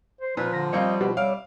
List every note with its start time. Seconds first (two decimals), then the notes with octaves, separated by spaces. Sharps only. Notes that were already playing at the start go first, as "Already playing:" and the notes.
0.21 C5
0.37 A#2 F3 B4
0.53 D3 A#5
0.73 G3 A#3 C4 F4 D#5 G5 C#6
1.01 B2 F#4 G4 B4
1.17 G3 C#5 E5 F5 D6